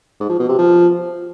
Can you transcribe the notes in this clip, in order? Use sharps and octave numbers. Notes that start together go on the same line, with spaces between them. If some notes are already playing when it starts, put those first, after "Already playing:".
G#2
F3
B2
C3
F3